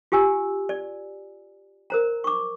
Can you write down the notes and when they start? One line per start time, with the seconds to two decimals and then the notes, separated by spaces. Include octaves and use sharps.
0.12 F4 G4 G#5 E6
0.69 D5
1.90 A#4 C5 A#5
2.24 C#6 D6